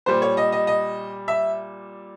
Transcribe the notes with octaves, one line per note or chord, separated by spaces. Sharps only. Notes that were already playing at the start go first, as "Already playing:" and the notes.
A#2 G3 C5
C#5
D#5
D#5
D#5
E5